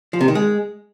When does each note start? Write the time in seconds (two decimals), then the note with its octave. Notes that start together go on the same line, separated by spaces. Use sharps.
0.13 F3
0.21 C3
0.28 D#3
0.35 G#3